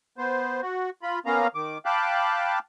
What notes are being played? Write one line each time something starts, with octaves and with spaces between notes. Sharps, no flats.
B3 C5
F#4
F4 B5
A#3 B3 C#4 F5 A#5
D#3 D6
F5 G5 A5 B5 D6 F#6